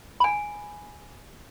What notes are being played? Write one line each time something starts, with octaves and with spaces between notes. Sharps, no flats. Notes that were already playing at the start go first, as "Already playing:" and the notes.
G#5 B5